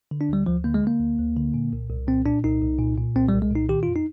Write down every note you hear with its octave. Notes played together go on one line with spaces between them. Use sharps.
D3
D4
D2 G3
D2 F3
D3 A#3
G#3
D3 A#3
D2
D2
D3
A#2
C2
C2
A#2 C4
A#2 D4
C2 D#4
C2
A#2
A#2
C2 C4
G3
C2
G#3
A#2
D#4
D#3 G4
F2 F4
D#4